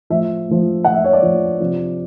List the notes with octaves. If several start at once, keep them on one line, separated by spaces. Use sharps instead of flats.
A2 F3 E5
A2 F3
A2 F3 F#5
E5
C#5
D5
A2 F3
C3 F3